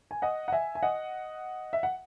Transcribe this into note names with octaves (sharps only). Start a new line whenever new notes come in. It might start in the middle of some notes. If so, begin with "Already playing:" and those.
G#5
D#5 F#5
F#5
E5 G#5
G#5
D#5 F#5
E5
F#5